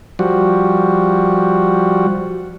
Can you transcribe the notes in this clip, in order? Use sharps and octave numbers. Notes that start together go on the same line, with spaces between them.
F3 G3 F#4